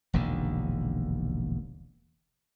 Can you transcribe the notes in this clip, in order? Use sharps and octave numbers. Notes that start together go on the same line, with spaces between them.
E1 A#1 D#2 D3